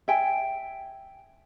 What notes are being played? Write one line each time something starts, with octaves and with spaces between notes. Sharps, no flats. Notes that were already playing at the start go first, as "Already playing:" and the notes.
E5 G5 G#5